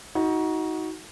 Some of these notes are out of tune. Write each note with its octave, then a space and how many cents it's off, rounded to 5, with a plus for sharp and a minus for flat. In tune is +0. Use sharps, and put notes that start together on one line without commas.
D#4 +25 F#4 +0